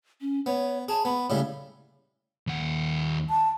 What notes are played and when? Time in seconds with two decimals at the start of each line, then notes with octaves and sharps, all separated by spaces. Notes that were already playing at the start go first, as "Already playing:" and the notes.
0.21 C#4
0.46 B3 C#5
0.89 G#4 A5
1.05 B3 B5
1.30 A2 C#3 G3
2.47 D#2 F#5
3.30 A5